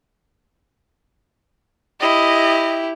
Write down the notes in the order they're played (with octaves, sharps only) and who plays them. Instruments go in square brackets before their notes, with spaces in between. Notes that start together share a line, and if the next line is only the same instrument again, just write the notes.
[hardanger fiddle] E4 G4 [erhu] D#5